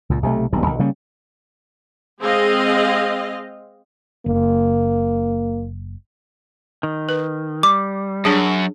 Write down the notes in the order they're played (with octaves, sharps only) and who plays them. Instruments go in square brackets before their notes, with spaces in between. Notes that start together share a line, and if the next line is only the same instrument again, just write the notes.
[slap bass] C#2 A#2
B1 C3 D#3 A3
D#1 B1 G2
B1 D#3
C#3 G3 A#3 C#4
[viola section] G#3 C4 G#4 D#5 F5
[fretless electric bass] F#1 [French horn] A#3
[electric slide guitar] D#3
[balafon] B4
[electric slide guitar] G3 [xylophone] D6
[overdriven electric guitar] F#2 [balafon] D4 G#4